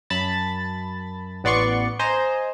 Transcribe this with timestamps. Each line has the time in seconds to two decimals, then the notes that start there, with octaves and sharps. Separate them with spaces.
0.10 F#2 A5 B5 A6
1.44 A1 B3 D5 C6 C#6 C#7
1.99 C5 D#5 G#5 A#5